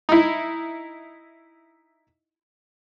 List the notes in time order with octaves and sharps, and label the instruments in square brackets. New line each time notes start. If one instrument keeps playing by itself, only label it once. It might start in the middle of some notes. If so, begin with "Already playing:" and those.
[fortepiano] D#4 E4